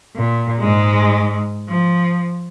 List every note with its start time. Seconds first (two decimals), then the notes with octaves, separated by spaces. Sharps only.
0.16 A#2
0.59 G#2 G#3
1.68 F3